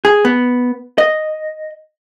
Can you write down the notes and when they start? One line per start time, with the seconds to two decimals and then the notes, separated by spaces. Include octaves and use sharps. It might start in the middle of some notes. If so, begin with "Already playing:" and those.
0.05 G#4
0.25 B3
0.98 D#5